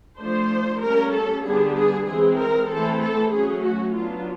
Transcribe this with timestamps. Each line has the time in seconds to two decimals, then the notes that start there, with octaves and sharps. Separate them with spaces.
0.19 F3 A3 D4 C5
0.82 G3 A#3 C#4 A#4
1.13 A4
1.45 D3 G3 B3 D4 G#4
1.76 G#4
2.07 E3 G#3 C4 G#4
2.39 A#4
2.70 E3 A3 C4 A4
3.01 A4
3.32 F#3 A3 C#4 G#4
3.63 F#4
3.95 F#3 B3 D4 F4